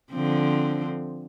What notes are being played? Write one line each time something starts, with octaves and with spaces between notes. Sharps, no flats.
D3 F3 C4